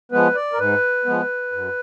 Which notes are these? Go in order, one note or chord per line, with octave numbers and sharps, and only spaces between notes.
F3 G#3 B3 B4
D5
A#4
G#2 B4
F3 G#3 B3
F#2